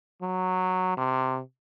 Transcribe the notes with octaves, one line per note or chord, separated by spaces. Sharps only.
F#3
C3